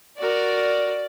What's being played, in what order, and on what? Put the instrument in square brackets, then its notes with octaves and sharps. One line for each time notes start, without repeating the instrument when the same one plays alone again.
[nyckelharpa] F#4 A#4 [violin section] D5